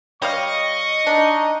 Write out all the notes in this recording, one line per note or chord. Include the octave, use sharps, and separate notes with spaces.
G3 C#5 D#5 F5 C#6
D4 D#4